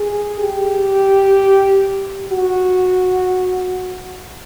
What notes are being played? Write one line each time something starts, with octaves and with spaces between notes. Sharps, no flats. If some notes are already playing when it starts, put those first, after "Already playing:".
Already playing: G#4
G4
F#4